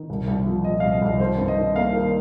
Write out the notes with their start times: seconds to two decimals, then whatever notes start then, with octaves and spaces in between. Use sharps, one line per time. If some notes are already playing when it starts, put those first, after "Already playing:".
Already playing: D#3
0.10 C2
0.28 C2
0.46 F3
0.64 A#2 D#5
0.80 C2 F5
0.92 D#5
1.02 C2
1.20 D#3 C5
1.38 G2
1.48 D#5
1.57 D#3
1.75 A#3 F5
1.93 D#3